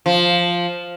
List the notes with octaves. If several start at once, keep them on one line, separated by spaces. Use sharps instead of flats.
F3